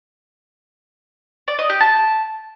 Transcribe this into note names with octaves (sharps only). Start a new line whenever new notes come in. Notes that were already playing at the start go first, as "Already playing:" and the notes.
D5
D#5
G4
A5